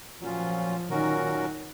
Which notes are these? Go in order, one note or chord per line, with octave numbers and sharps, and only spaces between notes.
A#2 F3 F#3 C#4 F4
A#2 D#3 F#3 C#4 F#4 A#4